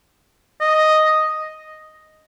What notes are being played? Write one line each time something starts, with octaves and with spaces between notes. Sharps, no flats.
D#5